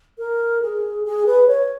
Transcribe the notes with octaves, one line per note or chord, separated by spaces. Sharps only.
A#4
G#4
G#4
B4
C#5